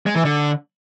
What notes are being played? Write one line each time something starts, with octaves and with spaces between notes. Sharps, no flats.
G#3
E3
D3